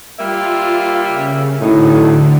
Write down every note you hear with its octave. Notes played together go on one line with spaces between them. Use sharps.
G3 A#3 F4 E5
C#3
A2 D3 F#3 D#4